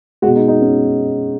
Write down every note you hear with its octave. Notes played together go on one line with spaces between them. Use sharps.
G#3 F#4
B2
D#4
D#4
C#4